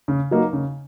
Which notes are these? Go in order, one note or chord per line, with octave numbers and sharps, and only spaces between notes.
C#3
F#3 A#3 D#4
C#3